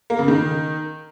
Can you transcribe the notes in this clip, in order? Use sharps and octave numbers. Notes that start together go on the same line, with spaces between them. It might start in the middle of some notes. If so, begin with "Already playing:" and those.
A#3
C#3
D#3